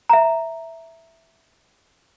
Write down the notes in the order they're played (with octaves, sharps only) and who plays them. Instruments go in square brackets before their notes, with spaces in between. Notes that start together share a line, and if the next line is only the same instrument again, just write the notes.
[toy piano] E5 A#5